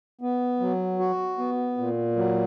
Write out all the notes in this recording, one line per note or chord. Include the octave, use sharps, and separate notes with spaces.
B3
F#3
F#4
B3
A#2
F#3